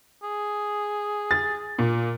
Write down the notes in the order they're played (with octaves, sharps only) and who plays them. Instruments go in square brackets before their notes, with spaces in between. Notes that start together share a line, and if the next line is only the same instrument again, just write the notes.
[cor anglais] G#4
[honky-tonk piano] A6
A#2